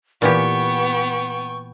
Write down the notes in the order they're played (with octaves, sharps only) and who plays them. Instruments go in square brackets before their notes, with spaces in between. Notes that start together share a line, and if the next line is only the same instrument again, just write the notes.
[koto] A#2 E3 G4 [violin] B3 G5 [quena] C#6